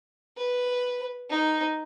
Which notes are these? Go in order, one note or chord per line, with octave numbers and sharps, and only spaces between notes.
B4
D#4